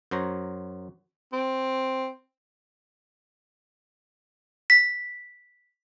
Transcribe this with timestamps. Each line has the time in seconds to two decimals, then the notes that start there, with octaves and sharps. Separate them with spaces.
0.11 F#2 F#3 C5 C#5 A#5
1.32 C4
4.70 B6